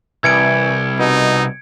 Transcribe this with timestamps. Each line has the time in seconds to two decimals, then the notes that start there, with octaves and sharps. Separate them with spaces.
0.24 C2 E3 G#6 C#7 D7
0.99 B2 D#4